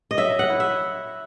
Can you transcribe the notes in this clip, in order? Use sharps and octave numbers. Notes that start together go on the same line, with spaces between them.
D#5
F#3 E5
F#5
E4
E5